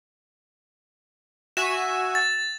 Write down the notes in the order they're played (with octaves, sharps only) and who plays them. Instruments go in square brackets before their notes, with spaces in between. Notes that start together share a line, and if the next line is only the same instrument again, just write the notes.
[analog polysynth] F#4 E5 G#5 [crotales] E7
[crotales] A6